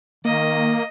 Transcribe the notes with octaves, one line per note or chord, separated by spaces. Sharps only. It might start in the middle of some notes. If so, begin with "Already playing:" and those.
D#3 A#3 D#5